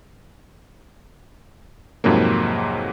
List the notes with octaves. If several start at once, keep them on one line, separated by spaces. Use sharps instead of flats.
F2 G#2 C3 F#3 A#3